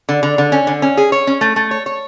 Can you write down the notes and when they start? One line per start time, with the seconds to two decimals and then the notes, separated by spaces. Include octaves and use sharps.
0.09 D3
0.23 D3
0.38 D3
0.52 C#4
0.67 D3
0.82 C#4
0.97 G#4
1.12 C#5
1.27 C#4
1.41 A3
1.56 A3
1.71 C#5
1.86 C#5